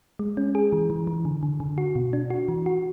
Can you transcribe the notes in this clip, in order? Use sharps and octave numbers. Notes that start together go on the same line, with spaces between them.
G#3
C#4
G#4
E3
E3
E3
D3
D3
D3
F#4
B2
D4
F#4
E3
F#4